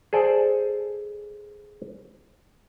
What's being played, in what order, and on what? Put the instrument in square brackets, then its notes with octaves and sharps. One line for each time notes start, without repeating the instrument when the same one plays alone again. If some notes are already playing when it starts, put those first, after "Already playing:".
[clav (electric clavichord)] G#4 A4 C5 D5